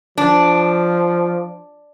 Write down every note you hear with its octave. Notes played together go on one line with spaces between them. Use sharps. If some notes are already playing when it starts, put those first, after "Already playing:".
F3 D4